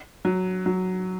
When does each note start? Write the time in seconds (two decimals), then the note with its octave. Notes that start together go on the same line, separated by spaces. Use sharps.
0.25 F#3
0.66 F#3